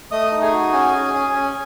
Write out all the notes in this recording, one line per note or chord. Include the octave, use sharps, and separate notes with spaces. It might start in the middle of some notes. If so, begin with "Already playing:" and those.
A3 D#5 D#6
D#4
G#4 G#5
F#4
C#4
G#4
C#4
C#4